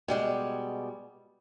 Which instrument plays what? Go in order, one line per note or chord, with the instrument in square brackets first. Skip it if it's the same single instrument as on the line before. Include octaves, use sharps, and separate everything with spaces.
[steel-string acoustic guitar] B2 G3 G#3